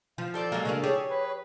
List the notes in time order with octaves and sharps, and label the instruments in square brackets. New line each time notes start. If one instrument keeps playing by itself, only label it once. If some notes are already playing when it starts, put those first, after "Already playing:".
[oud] F3 [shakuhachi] F5
[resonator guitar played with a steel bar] G3 C5 D5 [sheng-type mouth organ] A4 A5
[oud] F#3 [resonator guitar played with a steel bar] G#3 A#3
[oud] C#3 D4 A#4
[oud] G4 [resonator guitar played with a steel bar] G#4 [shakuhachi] C#5
[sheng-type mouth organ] B4